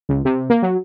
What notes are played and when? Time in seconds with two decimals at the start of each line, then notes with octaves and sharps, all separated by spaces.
0.09 C#2
0.25 C3
0.50 A#3
0.62 F#3